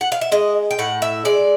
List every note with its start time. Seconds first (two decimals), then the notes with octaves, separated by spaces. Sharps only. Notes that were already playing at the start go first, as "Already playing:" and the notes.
0.01 F#5
0.12 F5
0.21 E5
0.32 G#3 D#5
0.71 G5
0.79 A2 F#5
1.02 E5
1.25 G#3 D5